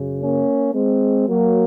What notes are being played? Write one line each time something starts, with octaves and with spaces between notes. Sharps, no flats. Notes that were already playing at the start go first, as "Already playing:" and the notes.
Already playing: F#2 C#3
A#3 C#4
G#3 C4
F#3 A#3